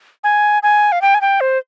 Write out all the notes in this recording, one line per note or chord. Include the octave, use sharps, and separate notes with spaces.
G#5
G#5
F5
G5
G#5
G5
C5